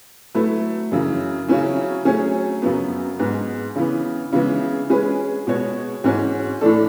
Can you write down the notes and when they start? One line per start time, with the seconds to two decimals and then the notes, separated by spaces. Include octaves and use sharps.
0.35 F#3 A3 E4 B4
0.92 F#2 C#3 E3
1.48 C#3 F#3 C#4 E4
2.05 F#3 A3 C#4 G#4
2.62 F#2 C#3 F#3 B3
3.19 G#2 G#3 B3
3.76 C#3 E3 B3
4.33 C#3 E3 G#3 B3 E4
4.90 G#3 C#4 G#4 B4
5.47 B2 G#3 B3 F#4 C#5
6.04 G#2 E3 G#3 C#4 F#4
6.61 A2 E3 A3 D4 A4